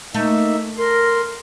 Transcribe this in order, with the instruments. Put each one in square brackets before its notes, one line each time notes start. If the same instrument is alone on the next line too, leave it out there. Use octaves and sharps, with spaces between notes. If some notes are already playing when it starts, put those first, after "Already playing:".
[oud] A3 [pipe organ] A#3 D#4 E5
[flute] A#4 [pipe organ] C6